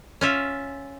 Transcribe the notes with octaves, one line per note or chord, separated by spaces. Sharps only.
C#4 F4 E5